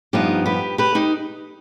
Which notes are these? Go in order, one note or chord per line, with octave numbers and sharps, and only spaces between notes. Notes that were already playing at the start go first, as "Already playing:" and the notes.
G2 F3 B3 D#4 G4
G4 B4
G4 B4
D#4 G4